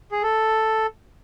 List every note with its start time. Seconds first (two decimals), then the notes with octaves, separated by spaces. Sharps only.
0.12 G#4
0.23 A4